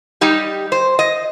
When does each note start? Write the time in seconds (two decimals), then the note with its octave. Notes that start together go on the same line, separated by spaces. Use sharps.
0.21 G3 D#4 G4
0.72 C5
0.99 D#5